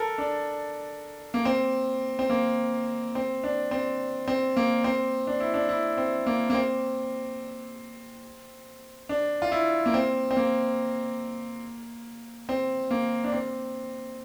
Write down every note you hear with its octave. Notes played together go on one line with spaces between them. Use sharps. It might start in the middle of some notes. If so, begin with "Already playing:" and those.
Already playing: A4 A#4
D4
A#3
C4
C4
A#3
C4
D4
C4
C4
A#3
C4
D4
E4
D4
E4
C4
A#3
A#3
C4
D4
F4
E4
A#3
C4
C4
A#3
C4
A#3
D4
C4